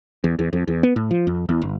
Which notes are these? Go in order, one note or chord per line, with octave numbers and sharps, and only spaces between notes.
E2
E2
F2
E2
B3
A2
F3
F2
E2
G1